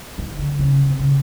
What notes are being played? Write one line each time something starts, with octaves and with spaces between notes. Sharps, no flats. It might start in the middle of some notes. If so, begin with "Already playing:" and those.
D#3
D3
C#3
C3
C#3